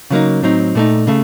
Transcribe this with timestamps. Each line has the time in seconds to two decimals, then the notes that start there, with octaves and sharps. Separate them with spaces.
0.10 C#3 F#3 A#3 D#4
0.42 A2 F#3 C4 D#4
0.75 A#2 A3 D#4
1.07 C#3 A3